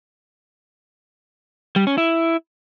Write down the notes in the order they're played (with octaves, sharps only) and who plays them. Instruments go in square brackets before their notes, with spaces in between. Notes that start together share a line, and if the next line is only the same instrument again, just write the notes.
[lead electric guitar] G3
C#4
E4